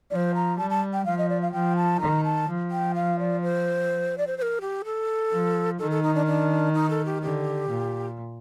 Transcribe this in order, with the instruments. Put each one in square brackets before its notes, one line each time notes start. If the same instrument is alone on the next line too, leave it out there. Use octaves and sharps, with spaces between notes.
[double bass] F3 [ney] C5 D5
[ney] A#5
[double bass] G3 [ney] A5
[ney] A5
G5
[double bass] F3 [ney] F5
[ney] D#5
D5
F5
[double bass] F3 [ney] G5
[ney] A5
[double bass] D#3 [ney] A#5
[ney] A5
[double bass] F3
[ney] G5
F5
D5
C5
D5
C5
C5
A#4
G4
A4
[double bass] F3
[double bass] D#3 [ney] A4
[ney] A4
D#4
D4
D4
D#4
A4
G4
[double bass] D3 [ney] G4
[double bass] A#2